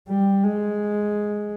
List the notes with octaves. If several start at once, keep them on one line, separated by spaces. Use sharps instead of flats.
G3
G#3